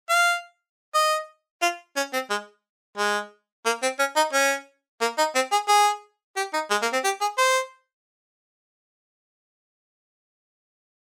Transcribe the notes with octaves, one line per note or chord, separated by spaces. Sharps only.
F5
D#5
F4
C#4
C4
G#3
G#3
A#3
C4
C#4
D#4
C#4
A#3
D#4
C4
G#4
G#4
G4
D#4
G#3
A#3
C4
G4
G#4
C5